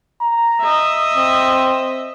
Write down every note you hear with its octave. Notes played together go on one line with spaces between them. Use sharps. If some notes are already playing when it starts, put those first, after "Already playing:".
A#5
D#5 E5
C4